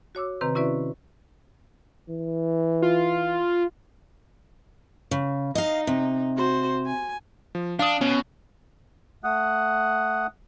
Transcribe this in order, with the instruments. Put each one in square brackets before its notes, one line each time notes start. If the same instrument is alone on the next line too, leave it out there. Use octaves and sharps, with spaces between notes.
[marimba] F#4 C#5 D6 E6
C3 D#3 C4 B4 A#5
C#4 E4 F#4 B4 D5 E5
[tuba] E3
[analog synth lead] F4
[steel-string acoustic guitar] C#3
[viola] D#4 [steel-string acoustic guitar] D#5 F5
[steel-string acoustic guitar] C3
[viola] F#4 C5
G#5
[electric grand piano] F3
[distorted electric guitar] D4 [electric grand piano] F5 D#6
[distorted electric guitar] B2 [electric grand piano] C#4
[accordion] A3 F#5 D#6 F#6